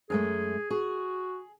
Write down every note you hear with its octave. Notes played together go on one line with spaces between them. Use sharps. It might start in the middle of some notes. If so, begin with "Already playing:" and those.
F#2 G#3 A3 G#4
F#4 G#4